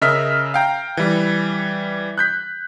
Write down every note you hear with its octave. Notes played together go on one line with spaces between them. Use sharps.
C#3 A#4 D#5 E5 F6 B6
F5 G5 A#5
E3 G3
F#6 G6 B6